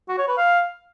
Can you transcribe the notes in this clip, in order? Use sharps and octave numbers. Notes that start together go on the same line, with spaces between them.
F#4
C#5
B4
F5